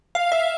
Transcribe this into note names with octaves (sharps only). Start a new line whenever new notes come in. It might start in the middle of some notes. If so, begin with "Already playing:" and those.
F5
E5